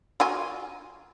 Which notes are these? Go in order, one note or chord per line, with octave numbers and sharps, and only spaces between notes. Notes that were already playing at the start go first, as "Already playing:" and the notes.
F#3 F4 G#5